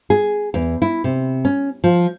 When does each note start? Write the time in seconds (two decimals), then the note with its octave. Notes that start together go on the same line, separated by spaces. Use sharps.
0.10 G#4
0.54 E2
0.82 E4
1.04 C3
1.45 C#4
1.84 F3